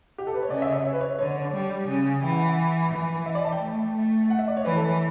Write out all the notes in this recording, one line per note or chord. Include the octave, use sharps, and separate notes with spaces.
G4
A4
B4
C#5
C#3 D5
E5
E5
C#5
B4
C#5
D3 C#5
G3
C#3
E3 G5
F#5
F#5
E3
E5
D5
A5
G5
A3
A3
F#5
E5
D5
C#5
E3 B4
A4